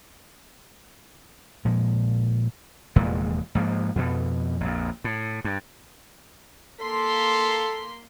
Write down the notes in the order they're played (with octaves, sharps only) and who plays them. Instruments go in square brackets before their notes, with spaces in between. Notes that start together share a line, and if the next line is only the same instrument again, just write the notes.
[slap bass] A#2 F3 G#3
F1 E2 A#2 G#3
G#2 F3 A#3
F2 B2
A#1 F2
A2
G2
[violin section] A#3 C6 B6 [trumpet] A4